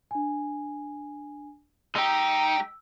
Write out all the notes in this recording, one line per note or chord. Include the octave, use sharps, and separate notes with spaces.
D4 G#5
G#3 D#4 G4 E6